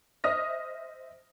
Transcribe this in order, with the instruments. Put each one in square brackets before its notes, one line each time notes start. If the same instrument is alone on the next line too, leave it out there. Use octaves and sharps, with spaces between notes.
[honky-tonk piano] C5 D#5 E5 D#6 F6 A#6